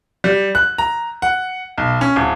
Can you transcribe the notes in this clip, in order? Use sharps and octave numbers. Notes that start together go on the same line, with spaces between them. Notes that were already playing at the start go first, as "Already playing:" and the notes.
G3
F#6
A#5
F#5
B1
C#4
D1